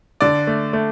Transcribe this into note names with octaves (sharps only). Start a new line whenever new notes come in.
D3 D5
A3
A3